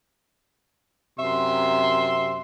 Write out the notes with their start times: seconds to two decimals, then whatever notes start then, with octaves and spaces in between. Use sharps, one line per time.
1.19 F#2 C3 E5 C6